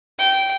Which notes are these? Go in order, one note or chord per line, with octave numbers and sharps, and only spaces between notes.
G5